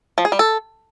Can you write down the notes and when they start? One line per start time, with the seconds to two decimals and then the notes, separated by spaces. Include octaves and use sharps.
0.18 F3
0.25 G#4
0.32 G3
0.39 A4